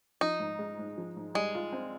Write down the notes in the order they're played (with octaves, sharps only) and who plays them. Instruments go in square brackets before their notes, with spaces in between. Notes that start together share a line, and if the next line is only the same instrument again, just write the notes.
[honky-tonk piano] F3 [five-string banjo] D#4
[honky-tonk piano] G#2
G#3
G#2
F3
G#2
[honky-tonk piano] G3 [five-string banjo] G#3
[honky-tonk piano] F4
C4